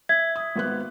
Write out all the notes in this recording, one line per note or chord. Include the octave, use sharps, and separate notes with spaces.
E5 G#6
D#6
G#1 B3 F#6